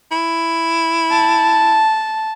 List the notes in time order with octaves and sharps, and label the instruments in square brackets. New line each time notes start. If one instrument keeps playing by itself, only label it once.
[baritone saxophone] E4
[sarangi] A5